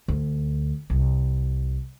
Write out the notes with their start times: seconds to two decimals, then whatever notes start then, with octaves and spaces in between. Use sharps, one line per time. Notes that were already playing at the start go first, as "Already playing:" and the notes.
0.08 D2
0.90 C2